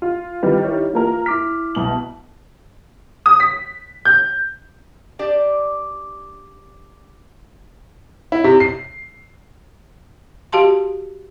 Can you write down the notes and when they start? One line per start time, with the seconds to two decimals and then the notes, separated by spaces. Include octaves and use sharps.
0.02 F4
0.43 D#3 E3 G3 F4 G4 B4
0.64 E4 C#5
0.94 E3 A#3 F4 A#4
1.26 E4 D6 F6 B6
1.75 C2 B2 F#7
3.26 D#6
3.40 B6
4.05 G6
5.19 D4 G4 D5
8.32 E4
8.44 C3
8.60 C7
10.52 F#4 G4 F5 A5 C6